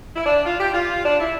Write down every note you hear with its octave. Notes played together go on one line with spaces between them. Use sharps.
E4
D4
F4
G4
F4
D4
E4